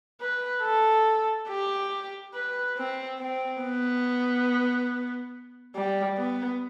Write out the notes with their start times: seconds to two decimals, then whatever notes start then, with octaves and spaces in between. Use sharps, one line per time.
0.21 B4
0.63 A4
1.49 G4
2.34 B4
2.77 C4
3.20 C4
3.62 B3
5.76 G3
6.18 B3